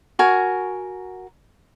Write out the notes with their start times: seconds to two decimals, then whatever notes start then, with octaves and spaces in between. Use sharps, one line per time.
0.19 F#4 A#4 G#5